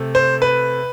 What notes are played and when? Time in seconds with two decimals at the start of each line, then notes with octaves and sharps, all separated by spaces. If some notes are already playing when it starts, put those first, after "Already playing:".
Already playing: C3 A3
0.15 C5
0.42 B4